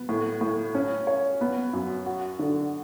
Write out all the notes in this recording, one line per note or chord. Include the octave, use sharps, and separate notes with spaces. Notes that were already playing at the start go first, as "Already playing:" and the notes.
Already playing: B3
A2
A2
C#4
C#5
B3
F#2
F#4
D3